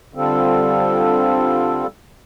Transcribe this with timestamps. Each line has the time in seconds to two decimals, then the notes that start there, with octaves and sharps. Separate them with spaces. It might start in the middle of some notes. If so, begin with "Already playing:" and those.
0.14 D3 G3 C4 F4 A4